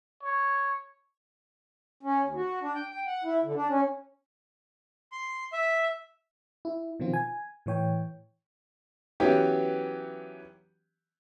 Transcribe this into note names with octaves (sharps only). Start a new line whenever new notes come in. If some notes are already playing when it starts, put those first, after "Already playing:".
C#5
C#4
D#2
F#4
D4
G5
G5
F#5
E4
D3
D4
C#4
C6
E5
E4
B2 D#3 F3 C4 F4
G#5
A2 E3 C#5 G5
E3 F#3 B3 C#4 G4